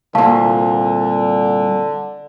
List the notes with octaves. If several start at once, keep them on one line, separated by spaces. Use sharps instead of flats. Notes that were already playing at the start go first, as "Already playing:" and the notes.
C2 A#2 D3 F5 A5 C#6